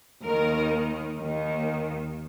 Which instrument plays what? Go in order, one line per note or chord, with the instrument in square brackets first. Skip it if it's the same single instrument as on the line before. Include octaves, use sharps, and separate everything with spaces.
[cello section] D#2 D#3 A#4
D#2 D#3